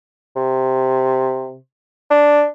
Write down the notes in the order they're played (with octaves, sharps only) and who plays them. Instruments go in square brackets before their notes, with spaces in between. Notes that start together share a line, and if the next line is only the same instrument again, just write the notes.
[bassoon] C3
D4